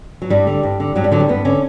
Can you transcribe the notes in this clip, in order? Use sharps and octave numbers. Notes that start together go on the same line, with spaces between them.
F#3
G2 G3
D3
G2
D3
G2 F#3
G3
D3 F#3
G3
G2 B3
D3 C#4